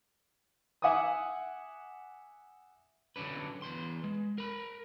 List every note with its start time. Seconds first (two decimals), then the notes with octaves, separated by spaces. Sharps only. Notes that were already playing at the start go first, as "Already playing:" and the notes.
0.82 E5 F#5 G#5 D6 D#6
3.16 D3 F#3 C#4 D4 B4
3.62 E2 B4 C6
4.04 G#3
4.38 A#4 B5